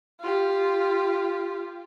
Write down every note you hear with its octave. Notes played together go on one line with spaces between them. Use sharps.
F4 G4